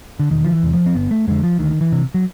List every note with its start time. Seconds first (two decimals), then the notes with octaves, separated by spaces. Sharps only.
0.20 D3
0.31 E1 D#3
0.45 F3
0.52 E3
0.63 E2 C3
0.73 F3
0.86 C4
0.95 G1 B3
1.11 A3
1.27 F2 D3 G#3
1.44 F3
1.59 D2 D#3
1.81 E3
1.92 C3
2.14 F#3